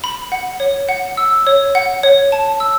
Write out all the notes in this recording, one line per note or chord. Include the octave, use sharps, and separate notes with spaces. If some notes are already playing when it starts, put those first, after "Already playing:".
B5
F#5
C#5
F#5
E6
C#5
F#5
C#5
A5
E6